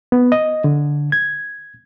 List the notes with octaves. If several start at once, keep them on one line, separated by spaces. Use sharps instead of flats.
B3
D#5
D3
G#6